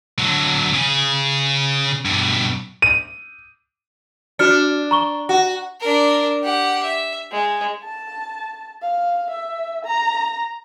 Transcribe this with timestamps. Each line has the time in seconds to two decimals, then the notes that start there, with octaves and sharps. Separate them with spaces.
0.19 D3 F#3
0.74 C#3 G#4
2.05 G2 B2
2.82 D#7
4.39 D4 F#4 F6 C#7
4.91 A#5 C#6 G7
5.29 F#4
5.80 D4 A#4
6.43 G4 F#5
6.83 E5
7.31 G#3
7.83 A5
8.82 F5
9.30 E5
9.85 A#5